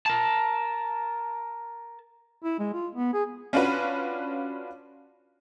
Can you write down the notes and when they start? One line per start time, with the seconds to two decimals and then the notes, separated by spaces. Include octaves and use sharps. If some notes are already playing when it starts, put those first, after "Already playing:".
0.06 A#4 A5
2.44 E4
2.59 G#3
2.74 F4
2.95 B3
3.13 G#4
3.53 C#4 D4 F4 F#4 B4